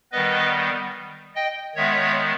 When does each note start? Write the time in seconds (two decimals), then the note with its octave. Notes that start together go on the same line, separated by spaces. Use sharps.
0.12 D#3 G3 B3 B4 D#5
1.35 D#5 G5
1.76 D#3 G#3 B3 C#5 E5